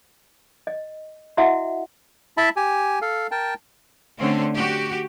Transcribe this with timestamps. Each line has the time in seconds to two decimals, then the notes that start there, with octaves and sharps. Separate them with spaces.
0.67 D#5
1.37 E4 F#4 D#5 E5 F#5
2.37 E4 E5 A5 B5
2.56 G4 G#5
3.02 A4 F5
3.31 A#4 G5 A5
4.19 D3 A3 C4 C#4
4.54 F#4 G4